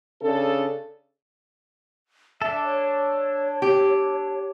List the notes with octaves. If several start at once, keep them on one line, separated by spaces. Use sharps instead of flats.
C#3 D4 A4
D4 A4 E5
C#5
G4